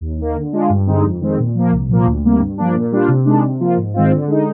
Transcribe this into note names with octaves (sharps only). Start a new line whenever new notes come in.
D#2
D#3 A#3
D3
G#3 D4 F4
G2
D3 G#3 C4 D#4
F2
D#3 G#3 C4
A#2
F3 A#3
C2
A#2 F3 A#3
D2
C3 G3 A#3
G2
F3 A#3 D4
A#2
G3 D4 F4
C3
D#3 G#3 D4
C3
F3 A#3 F4
G#2
D#3 G#3 C4 F4
D3
G#3 D#4